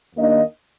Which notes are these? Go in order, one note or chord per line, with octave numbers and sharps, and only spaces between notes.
D#2 D#3 A#3 D4 D#5